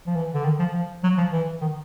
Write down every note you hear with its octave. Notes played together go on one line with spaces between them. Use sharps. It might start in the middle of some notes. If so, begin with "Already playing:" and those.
F3
E3
D3
D#3
F3
F3
F#3
F3
E3
D#3